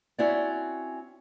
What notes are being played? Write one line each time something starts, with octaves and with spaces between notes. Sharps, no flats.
C4 C#4 E4 F#4 D5